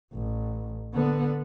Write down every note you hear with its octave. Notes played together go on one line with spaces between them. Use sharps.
A1
D3 B3